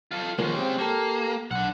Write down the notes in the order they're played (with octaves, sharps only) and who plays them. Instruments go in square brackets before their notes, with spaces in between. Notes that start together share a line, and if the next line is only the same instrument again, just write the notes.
[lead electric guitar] F4 A4
[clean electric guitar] D#3 F3 A#3 [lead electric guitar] G#3 C#4
[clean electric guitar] C4 G4
[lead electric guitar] A#3 [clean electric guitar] G4 A4
[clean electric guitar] B1 [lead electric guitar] D4 F#5